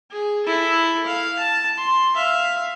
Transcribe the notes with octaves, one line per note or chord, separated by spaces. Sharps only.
G#4
E4 A4
F5
A5
C6
E5 F5